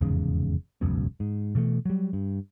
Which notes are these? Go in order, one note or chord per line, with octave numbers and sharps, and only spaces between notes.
F1 E2 G#2 C#3
E1 C#2 F#2 B2
G#2
B2 E3 A3
F#3 G3
G2